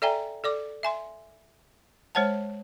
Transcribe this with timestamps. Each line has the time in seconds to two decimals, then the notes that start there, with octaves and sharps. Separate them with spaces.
0.02 A4 D5 E5 G5 G#5 A#5
0.44 A4 D5 D6
0.83 E5 G#5 C6
2.15 G#3 C5 C#5 F#5 A5